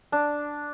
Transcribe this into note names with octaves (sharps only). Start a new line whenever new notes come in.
D4